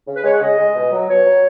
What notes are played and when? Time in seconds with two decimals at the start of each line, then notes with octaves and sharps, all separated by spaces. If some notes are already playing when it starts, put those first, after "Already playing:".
0.07 C#3
0.16 B4
0.24 G#3 C#5
0.33 F#5
0.41 C#3 D#5
0.58 G#3
0.75 B2
0.92 F#3
1.09 B2 C#5
1.26 F#3